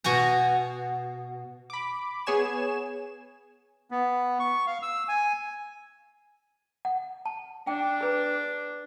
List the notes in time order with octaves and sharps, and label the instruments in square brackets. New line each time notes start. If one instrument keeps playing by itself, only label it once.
[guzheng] B2 F#4 G#5 A#5
[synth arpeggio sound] B5 D6
B3 G#4 C#5 G#5 E7
[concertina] B3
C#6
F5
E6
G#5
[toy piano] F#5
A5
[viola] D4 [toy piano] G5
[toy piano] G#4 B4